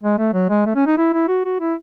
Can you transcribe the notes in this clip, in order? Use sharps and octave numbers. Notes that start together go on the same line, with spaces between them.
G#3
A3
F#3
G#3
A3
C#4
D#4
E4
E4
F#4
F#4
E4